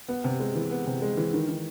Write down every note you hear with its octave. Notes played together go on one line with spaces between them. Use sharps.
B3
C3
G#3
E3
B3
C3
G#3
E3
D#3
D#3